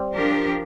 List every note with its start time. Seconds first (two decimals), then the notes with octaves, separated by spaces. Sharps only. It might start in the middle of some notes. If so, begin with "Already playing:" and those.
Already playing: G3 C4
0.14 F3 D4 G4 A#4